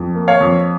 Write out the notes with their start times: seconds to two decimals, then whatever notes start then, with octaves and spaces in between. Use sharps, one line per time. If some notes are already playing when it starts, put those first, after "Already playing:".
Already playing: F2
0.15 A#3
0.28 C#5 F5
0.41 F2